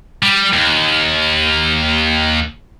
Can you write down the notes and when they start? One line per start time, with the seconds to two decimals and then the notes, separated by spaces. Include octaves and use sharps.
0.23 G3
0.53 D#2